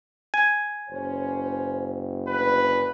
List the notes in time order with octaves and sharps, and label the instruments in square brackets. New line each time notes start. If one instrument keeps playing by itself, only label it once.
[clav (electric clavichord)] G#5
[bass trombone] F#1 [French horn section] C#4 B4 C5
[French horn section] D2 [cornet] B4